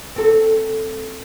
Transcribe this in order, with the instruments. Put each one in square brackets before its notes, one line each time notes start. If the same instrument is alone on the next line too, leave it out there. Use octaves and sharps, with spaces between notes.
[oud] C4 A4